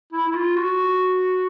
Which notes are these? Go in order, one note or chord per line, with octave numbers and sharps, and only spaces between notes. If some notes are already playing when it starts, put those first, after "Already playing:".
E4
E4
F4
F#4